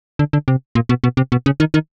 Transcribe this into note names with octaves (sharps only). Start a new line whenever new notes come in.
D3
D3
C3
A#2
B2
B2
C3
B2
C#3
D#3
D#3